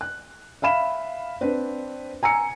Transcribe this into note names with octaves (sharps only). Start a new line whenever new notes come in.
F#6
E5 F5 B5 E7
C4 D4 B4 C5
G#5 A#5 E6 C#7